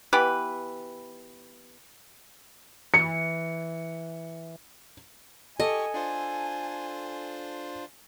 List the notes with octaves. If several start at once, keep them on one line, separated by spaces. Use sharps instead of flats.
E3 B3 G4 B4
E3 C#7
G4 A4 D#5 G#5 C#6
D4 F4 C5